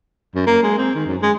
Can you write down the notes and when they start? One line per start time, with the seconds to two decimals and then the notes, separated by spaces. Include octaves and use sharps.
0.35 F#2
0.47 A#3
0.63 G#3
0.78 C4
0.95 D#3
1.07 F#2
1.22 G#3